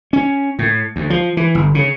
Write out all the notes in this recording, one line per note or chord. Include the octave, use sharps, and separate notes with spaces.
C#4
A2
D2
F3
E3
G1
C#3